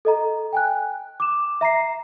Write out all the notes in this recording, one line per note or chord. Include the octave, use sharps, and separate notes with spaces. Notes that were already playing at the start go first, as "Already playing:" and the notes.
A4 D#5 A#5
G5 G#5 F#6
D6 E7
E5 A#5 A#6 C7